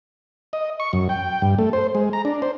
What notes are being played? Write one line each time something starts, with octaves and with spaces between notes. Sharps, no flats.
D#5
C#6
F#2
G5
G2
A3
C5
G#3
A#5
D4
C5